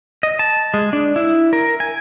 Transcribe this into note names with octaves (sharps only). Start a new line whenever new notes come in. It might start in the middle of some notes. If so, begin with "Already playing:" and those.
D#5
A5
G#3
D4
E4
A#4
G#5